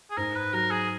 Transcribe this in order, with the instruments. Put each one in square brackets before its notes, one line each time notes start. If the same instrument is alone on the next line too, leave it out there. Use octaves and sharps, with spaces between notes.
[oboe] G#4
[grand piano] G#2 [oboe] A#4
[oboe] B4
[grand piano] F#3 [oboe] A#4
[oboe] G#4